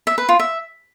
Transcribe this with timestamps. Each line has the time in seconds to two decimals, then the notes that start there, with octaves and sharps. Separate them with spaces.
0.07 E5
0.18 B4
0.29 F4
0.39 E5